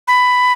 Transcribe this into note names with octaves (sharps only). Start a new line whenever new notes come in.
B5